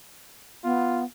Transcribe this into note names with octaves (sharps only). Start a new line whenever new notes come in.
B3 F4